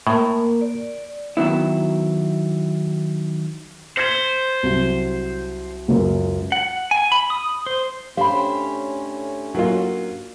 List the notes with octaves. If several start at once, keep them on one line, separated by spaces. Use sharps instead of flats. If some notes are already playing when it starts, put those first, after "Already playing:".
A2 A#3 A#4
D5
D#3 F#3 B3 E4
C5 G#6 B6 C#7
C2 F#3
C#2 F#2
F#5
G#5
B5
D#6
C5
A2 C#4 D4 G4 C5 F5 B5
F#3 A#3 F4